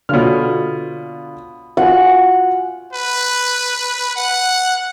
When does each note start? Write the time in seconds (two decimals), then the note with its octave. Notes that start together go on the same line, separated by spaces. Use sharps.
0.09 B2 D3 F4 C#5 F6
1.77 F4 F#4 F#5 G#5
2.93 B4
4.16 F#5